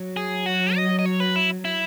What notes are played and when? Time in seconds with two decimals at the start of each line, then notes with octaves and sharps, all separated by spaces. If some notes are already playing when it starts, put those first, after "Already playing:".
Already playing: F#3
0.17 G#4
0.46 F#4
0.76 D#5
0.99 D#5
1.06 C#5
1.20 B4
1.36 E4
1.65 E4